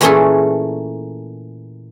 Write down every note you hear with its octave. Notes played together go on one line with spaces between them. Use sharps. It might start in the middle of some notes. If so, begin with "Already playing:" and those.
A#2 E3 A3 C#4 G#4 A4